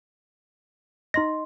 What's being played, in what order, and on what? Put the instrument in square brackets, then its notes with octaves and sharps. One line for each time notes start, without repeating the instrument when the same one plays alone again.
[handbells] D#4 A#6 [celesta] D#5 C6